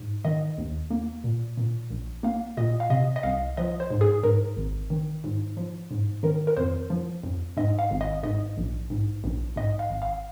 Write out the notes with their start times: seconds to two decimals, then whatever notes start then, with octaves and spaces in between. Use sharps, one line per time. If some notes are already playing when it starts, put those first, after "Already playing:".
Already playing: G#2
0.25 D#3 D#5
0.58 D#2
0.90 A#3
1.24 A#2
1.57 A#2
1.90 A#1
2.23 A#3 F5
2.57 A#2 D#5
2.80 F5
2.90 C3 D#5
3.16 D#5
3.23 C2 F5
3.57 F3 D#5
3.80 C5
3.90 G#2
4.01 G#4
4.23 G#2 A#4
4.57 G#1
4.90 D#3
5.24 G#2
5.57 F3
5.91 G#2
6.23 D#3 A#4
6.47 A#4
6.57 F2 C5
6.90 F3
7.24 F2
7.57 G#2 D#5
7.79 F5
7.91 G#1
8.01 D#5
8.23 G#2 D#5
8.57 A#1
8.90 G#2
9.24 A#1
9.56 G#2 D#5
9.79 F5
9.90 G#1
10.02 F5